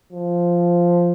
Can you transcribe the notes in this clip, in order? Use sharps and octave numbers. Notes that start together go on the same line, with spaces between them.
F3